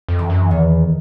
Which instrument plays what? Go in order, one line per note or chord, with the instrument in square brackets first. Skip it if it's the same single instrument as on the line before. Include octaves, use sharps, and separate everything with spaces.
[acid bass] F2
[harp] E3
[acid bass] F#2
[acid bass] E2 [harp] D#3